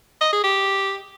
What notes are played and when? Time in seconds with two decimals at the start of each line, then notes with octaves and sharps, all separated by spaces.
0.21 D#5
0.32 G#4
0.44 G4